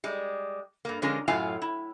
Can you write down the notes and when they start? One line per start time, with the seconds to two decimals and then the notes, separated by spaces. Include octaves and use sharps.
0.04 G3 G#3
0.85 G2 A#3
1.02 D3 F3 G#3 C#4 F4 A#4
1.28 F#2 A2 F#3 F4 F5 G#5
1.62 E4